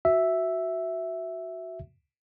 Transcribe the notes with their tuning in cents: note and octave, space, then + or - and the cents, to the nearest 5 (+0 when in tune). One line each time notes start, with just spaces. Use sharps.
F#4 +0 E5 +0